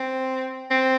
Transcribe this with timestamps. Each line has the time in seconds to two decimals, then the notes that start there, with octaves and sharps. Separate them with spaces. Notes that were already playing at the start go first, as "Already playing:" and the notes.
Already playing: C4
0.71 C4